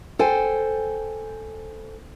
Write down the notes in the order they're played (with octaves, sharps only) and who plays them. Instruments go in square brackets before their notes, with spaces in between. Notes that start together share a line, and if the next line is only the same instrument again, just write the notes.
[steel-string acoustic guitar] A4 C5 G5 G#5